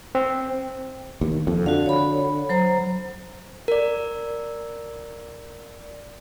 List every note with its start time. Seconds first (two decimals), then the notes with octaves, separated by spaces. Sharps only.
0.15 C4
1.21 D#2
1.47 F2
1.66 D3 F#4 F5
1.86 C#5 B5
2.49 F#3 C5 A#5
3.68 A#4 D5